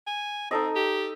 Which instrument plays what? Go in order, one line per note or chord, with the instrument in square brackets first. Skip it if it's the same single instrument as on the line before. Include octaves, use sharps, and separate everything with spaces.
[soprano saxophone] G#5
[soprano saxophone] C4 [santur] D#4 A4 D#5
[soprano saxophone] G4